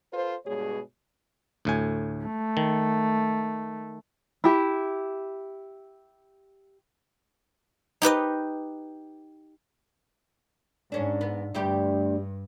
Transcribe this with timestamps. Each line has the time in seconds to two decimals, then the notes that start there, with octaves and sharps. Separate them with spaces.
0.13 F4 A4 B4 C5
0.46 G2 B2 G#3 G#4 C#5
1.65 D2 A2 G#5
2.24 A3
2.57 D#3
4.44 E4 G4
8.02 D#4 G4 B4 D#5
10.92 G#2 C#4 D4
11.21 B3
11.54 D2 G2 G3 G4